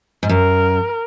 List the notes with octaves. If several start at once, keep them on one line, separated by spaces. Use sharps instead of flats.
G#2
F#2 A#4